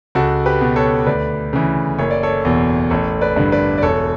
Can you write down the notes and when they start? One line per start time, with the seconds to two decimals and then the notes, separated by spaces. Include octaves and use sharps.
0.15 C#2 F#4 A4
0.46 G4 B4
0.61 B2
0.76 A4 C#5
1.07 D2 B4 D5
1.53 C#3 E3
1.98 F#1 C#5
2.11 D5
2.23 A4 C#5
2.45 E2 B2
2.90 A1 A4 C#5
3.21 B4 D5
3.36 G2 D3
3.52 B4 D5
3.78 D5
3.82 E1 A4 C#5